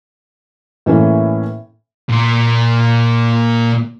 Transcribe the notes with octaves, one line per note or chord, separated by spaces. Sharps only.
A2 E3 A#3 C#4
A#2 A#3